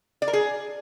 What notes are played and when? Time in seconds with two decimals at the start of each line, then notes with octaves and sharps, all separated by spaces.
0.22 D5
0.28 A#4
0.33 G#4